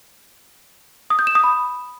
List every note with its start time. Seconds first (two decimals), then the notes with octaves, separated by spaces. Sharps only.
1.10 D#6
1.19 G6
1.27 E7
1.35 D#6
1.44 B5